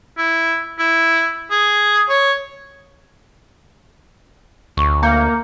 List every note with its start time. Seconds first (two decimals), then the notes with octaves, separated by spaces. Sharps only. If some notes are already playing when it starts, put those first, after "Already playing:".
0.18 E4
0.79 E4
1.51 G#4
2.09 C#5
4.77 D2 C#6
5.03 A#3 G6 C#7